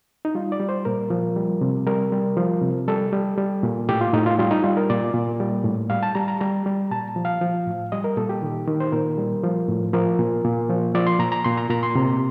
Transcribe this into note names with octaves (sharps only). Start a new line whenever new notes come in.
D#4
G3 F4
D5
G3
C5
A#2 A#4
F3
G3
C3
G3 A#4
G3
F3
C3
G3 A4
G3
G3
A#2
A2 G4
F4
A2 D#4
F4
G3 F4
D#4
G3 F4
A#4
A#2 D5
A#2
G3
A2
G3 F5
A5
G3 A#5
A#5
G3 A#5
G3
A#2 A5
F3
F5
F3
A2
G3 D#5
A#4
A#2 A4
G4
D#3
D#3
C5
A#2 A#4
G3
F3
A2
F3 A#4
A#2
A#2
F3
F3 D5
C6
A#2 A#5
A#5
A#2 C6
A#5
A#2 A#5
C6
C3